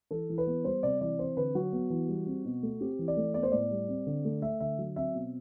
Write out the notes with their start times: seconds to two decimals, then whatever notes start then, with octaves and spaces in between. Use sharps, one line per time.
0.11 E3 A4
0.29 E3
0.38 B4
0.47 B3
0.64 G3 C5
0.83 C3 D5
1.01 E3 D5
1.19 C4 C5
1.37 D3 B4
1.55 F#3 F#4
1.73 B3
1.90 E3
2.08 G3
2.27 C4
2.45 B2
2.63 A3
2.81 C4 G4
2.99 E3
3.08 D5
3.17 A3
3.34 B3 D5
3.43 C5
3.52 A2 D5
3.71 G3
3.89 C4
4.07 D3
4.25 A3
4.42 A3 E5
4.60 D3 E5
4.78 F#3
4.96 C4 E5
5.14 B2